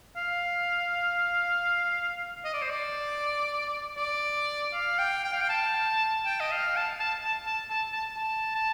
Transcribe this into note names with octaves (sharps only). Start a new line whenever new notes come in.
F5
D#5
D5
C5
D5
D5
F5
G5
G5
F5
G5
A5
G5
D#5
F5
A5
A5
A5
A5
A5
A5
A5
A5